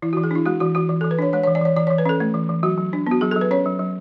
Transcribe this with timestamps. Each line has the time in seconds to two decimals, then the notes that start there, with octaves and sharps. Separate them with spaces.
0.02 E3 E4
0.13 F#4
0.17 E3
0.23 G#4
0.31 D4 E4
0.45 G#3 F#4
0.60 E3 F#4
0.75 E3 F#4
0.89 E3
1.01 A4
1.05 E3
1.11 B4
1.19 D4 C#5
1.33 G#3 C#5
1.43 C#5
1.48 E3
1.55 D5
1.62 E3 C#5
1.76 E3 D5
1.87 C#5
1.91 E3
1.98 B4
2.06 C#4 A4
2.20 A3
2.34 E3
2.49 E3
2.63 F#3 F#4
2.77 F#3
2.93 D4
3.07 B3 F#4
3.21 F#3 G#4
3.31 A4
3.36 F#3
3.41 B4
3.51 C#4 C#5
3.66 F#3
3.79 F#3